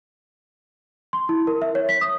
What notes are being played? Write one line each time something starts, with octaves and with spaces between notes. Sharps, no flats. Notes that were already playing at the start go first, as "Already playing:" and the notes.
C6
E4
A#4
E5
C#5
B6
D#6